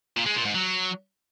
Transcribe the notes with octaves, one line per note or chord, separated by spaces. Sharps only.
A#2
G#3
A#2
G#2
F#3